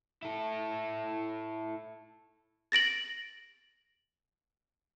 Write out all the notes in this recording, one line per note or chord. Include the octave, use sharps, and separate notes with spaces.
E4 A4
A6 A#6 D7 F#7